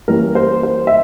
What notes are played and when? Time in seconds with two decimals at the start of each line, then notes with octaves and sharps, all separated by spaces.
0.08 E3 G3 A#3 C#4 A#4
0.35 C5
0.63 C5
0.87 E5